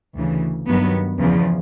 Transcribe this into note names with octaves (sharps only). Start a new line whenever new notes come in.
D2 C#3 E3
G2 D#3 F#3 B3
E2 C#3 F3